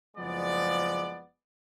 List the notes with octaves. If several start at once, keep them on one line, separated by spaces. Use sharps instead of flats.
F#1 F3 G#3 B3 D5